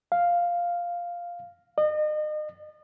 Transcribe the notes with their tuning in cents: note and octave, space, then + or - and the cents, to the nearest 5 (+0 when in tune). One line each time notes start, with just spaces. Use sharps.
F5 +0
D#5 -35